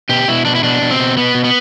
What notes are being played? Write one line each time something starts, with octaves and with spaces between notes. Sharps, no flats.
B2 G4
B2 E4
B2 D4
E4
B2 D4
B2
C4
B2
B2 B3
B2
B3